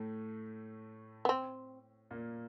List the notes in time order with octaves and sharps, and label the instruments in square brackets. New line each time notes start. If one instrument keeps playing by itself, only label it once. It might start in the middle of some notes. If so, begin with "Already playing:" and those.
Already playing: [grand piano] A2 A3
[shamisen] B3
C4
[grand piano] A#2 A#3